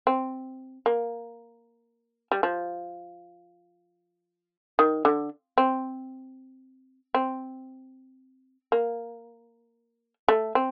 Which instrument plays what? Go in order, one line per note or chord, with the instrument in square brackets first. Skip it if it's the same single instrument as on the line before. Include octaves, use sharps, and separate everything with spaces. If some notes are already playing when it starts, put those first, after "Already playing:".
[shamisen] C4
A#3
G3
F3
D#3
D3
C4
C4
A#3
A3
C4